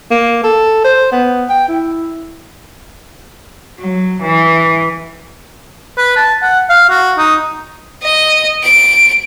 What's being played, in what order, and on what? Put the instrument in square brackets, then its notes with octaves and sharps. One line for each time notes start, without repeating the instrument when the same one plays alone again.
[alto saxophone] A#3
A4
C5
B3
G5
E4
[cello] F#3
E3
[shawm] B4
A5
F#5
F5
F#4
D#4
[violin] D#5
D7